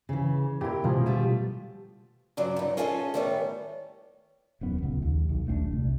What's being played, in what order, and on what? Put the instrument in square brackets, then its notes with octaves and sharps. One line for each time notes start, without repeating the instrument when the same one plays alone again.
[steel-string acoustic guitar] C#3 E3
[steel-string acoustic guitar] A#2 A#4 [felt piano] E4 G4
[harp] B2 [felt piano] F3 [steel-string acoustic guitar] G#3
[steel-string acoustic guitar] G3 A3 F4
G2 C#3 F#3 D5
G2 D#4
C#4 F4 G#4 A4 C5 D#5
A2 D#3 G3 B3 C#5
[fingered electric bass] D#1 F#2 B3
C#2
D#2
B1
D#1 A3 C4 D4
C2